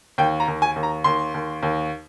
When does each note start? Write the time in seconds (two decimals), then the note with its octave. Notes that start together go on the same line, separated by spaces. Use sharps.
0.18 D#2 G5
0.40 A#5
0.48 D#2
0.62 G#5
0.76 D#2
0.83 A#5
1.04 D#2 C6
1.34 D#2
1.63 D#2